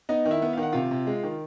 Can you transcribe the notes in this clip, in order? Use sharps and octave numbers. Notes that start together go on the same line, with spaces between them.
B3 D#4 D#5
D#3
E4 E5
B3
D#3 F5
F#5
C3 F4 F5
C3
G#3
D#3